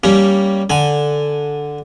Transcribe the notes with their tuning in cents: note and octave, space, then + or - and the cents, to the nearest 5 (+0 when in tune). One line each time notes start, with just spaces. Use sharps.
G3 +0 A#3 +5 C#4 +10
D3 +0 G#5 +0